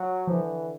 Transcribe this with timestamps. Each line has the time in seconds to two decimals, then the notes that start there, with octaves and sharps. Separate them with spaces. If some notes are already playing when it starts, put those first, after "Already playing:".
Already playing: F#3
0.27 D3 E3 F3